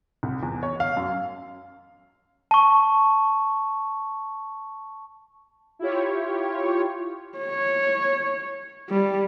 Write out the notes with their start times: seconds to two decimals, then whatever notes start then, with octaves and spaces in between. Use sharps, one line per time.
0.23 C2
0.43 E2
0.63 C#5
0.80 F5
0.97 F#2
2.51 A5 C#6
5.79 E4 F4 G4 C#5
7.38 C#5
8.89 G3